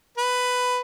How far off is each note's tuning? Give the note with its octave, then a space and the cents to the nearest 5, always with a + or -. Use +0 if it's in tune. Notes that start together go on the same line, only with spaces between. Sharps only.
B4 +10